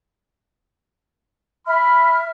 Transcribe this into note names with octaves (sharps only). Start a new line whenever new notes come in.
E5 B5 F6